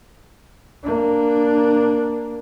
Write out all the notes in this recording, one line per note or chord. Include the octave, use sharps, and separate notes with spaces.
A#3 D4